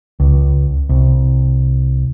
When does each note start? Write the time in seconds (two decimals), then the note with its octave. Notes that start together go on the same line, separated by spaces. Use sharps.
0.20 C#2
0.89 C2